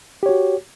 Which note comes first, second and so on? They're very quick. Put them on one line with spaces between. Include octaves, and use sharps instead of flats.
G4 C#5 F#4